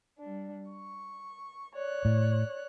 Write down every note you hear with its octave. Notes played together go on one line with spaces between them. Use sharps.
G3 D4
C#6
C#5 D5 F#6
A2